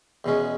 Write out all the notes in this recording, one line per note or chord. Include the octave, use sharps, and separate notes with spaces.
E2 B2 G#3 C#4